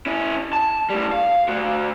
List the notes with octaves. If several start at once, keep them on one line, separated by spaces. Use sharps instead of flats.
C#4 E4
A5
A2 G3
F5
A3 F#4